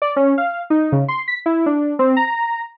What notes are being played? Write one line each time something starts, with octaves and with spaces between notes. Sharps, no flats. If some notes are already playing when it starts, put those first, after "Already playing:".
D5
C#4
F5
D#4
C#3
C6
B6
E4
D4
C4
A#5